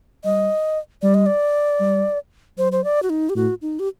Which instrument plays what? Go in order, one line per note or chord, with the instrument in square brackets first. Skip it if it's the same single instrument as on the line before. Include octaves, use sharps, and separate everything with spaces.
[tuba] G3 [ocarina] D#5
[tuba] G3 [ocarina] D5
[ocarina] D#5
D5
[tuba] G3
[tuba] F#3 [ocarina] C5
[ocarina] C5
D5
F#4
D#4
G4
[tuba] A2 [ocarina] F#4
[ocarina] D#4
G4